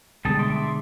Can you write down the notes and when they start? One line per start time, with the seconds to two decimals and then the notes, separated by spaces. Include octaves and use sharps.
0.25 B2 D3 G3 G#3 A5 D#6
0.39 E5 C6 D6